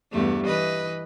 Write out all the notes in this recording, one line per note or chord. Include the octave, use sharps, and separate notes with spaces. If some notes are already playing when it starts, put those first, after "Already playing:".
E2 G2 A3
E3 B4 D#5